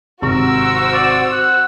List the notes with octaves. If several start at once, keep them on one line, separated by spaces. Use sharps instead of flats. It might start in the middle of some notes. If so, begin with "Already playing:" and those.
G#1 C3 F#4 A#4 C5 C#6 E6
D5
F#5